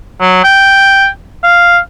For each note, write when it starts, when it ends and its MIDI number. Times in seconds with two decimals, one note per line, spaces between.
0.21 0.42 54
0.44 1.07 79
1.44 1.78 77